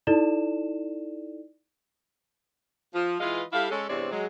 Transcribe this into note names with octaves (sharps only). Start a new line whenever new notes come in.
D#4 E4 A4 D5 E7
F3
E3 G#3 F4 B4 D#5 F5
G3 E4 A4 F5
G#3 C#4 A4
E2 G2 C3 C4 C#5 D5
F#3 G#3